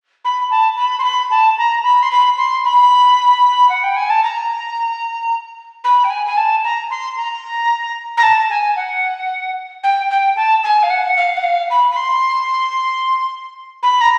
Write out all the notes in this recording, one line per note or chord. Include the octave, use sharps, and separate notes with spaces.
B5
A5
B5
C6
B5
A5
A#5
B5
C6
B5
C6
B5
F#5
G5
G#5
A5
A#5
B5
G5
G#5
G#5
A5
A#5
C6
A#5
A#5
A5
G#5
F#5
G5
G5
A5
G#5
F5
F#5
F5
F#5
F5
B5
B5
C6
B5
A#5